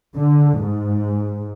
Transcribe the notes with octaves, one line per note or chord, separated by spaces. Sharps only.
D3
G#2